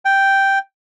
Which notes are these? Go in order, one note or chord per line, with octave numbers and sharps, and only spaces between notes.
G5